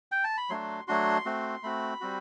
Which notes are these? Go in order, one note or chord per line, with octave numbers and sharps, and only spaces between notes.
G5
A5
B5
F#3 A3 D4 F#4 C6
F#3 A3 D4 F#4 C6
A3 C4 F#4
A3 C4 F#4 B5
G3 C4 F#4